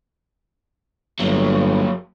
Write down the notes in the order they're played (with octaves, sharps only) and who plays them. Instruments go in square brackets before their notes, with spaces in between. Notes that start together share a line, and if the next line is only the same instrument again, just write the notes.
[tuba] G1 [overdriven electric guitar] F#3 A#3